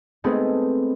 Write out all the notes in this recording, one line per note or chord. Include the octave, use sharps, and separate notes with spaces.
G#3 A3 B3 C4 D#4 G#4